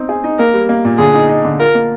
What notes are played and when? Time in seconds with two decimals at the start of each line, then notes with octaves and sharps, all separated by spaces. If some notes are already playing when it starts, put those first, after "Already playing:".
Already playing: C4 D#4
0.09 G#4
0.24 D#4
0.39 A#3 A#4
0.53 G3
0.69 A#3
0.85 A#2
0.98 D3 G#4
1.14 D#4
1.29 D#4
1.45 D3
1.59 F4 A#4
1.75 A#3